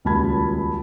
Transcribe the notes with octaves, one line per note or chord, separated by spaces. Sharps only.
D#1 C#2 F#4 A5 B5 G#6